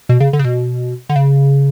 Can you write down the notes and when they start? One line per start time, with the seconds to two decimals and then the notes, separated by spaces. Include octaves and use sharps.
0.09 B2
0.20 C#3
0.33 D3
0.39 C#3
0.45 B2
1.09 D3
1.16 C#3